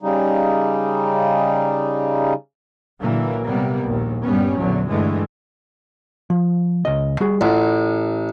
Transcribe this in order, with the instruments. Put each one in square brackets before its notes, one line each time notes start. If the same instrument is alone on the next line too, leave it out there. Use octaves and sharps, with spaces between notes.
[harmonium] C#3 G3 D#4
[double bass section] A#2 D3 E3 F#3 A#3
C3 G3 A#3 B3
A#1 D#2
G2 G3 B3 C#4
A#1 E2 D3 F#3
G2 D3 E3 G#3 A3
[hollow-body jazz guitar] F3
C#2 D#5
G3 F#4 G#4
[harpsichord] A1 [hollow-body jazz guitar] F4 E5 F#5